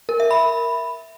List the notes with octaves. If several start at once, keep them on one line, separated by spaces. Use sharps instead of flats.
A#4
E5
B5